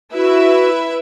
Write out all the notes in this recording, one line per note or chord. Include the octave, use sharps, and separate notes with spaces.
E4 F#4 B4 E5